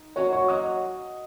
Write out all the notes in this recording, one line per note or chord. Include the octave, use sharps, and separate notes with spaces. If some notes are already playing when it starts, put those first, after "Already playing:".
Already playing: D#4
F#3 A#3 C#4 F#4 C#5 C#6
C#5 C#6
F#3 A#3 C#4 F#4 D#5 D#6